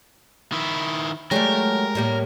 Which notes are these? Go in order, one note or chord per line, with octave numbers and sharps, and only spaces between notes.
D#3 E4
F#3 G#3 A3 G4 A#4 D5
A2 G3 A#3 C#5